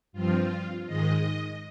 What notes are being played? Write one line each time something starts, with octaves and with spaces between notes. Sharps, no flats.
G2 F3 C4 F4
G#2 D#3 G#3 D#5